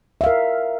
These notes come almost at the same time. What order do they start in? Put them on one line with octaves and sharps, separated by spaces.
E5 F5 A#4